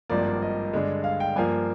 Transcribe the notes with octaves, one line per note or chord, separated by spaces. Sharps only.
G#1 G2 F3 A#3 D5
D#5
G2 D3 G#3
F5
G5
G2 F3 A#3 G#5